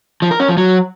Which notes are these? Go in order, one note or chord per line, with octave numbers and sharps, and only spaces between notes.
F3
A#4
C#4
F3
F#3